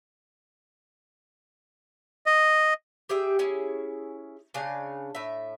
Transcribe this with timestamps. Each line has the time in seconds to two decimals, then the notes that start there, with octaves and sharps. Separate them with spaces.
2.26 D#5
3.09 G4 G#4 E5 G5
3.39 C#4 E4 G#4
4.54 C#3 D4 F5 G#5
5.15 A2 E5